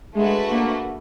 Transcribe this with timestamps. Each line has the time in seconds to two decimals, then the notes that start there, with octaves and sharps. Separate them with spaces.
0.15 G#3 A3 D4 F#4 B4
0.50 A#3